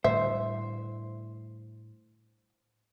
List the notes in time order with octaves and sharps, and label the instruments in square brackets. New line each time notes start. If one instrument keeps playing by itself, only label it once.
[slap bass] A2 D3 G3 [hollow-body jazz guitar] C5 [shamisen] E5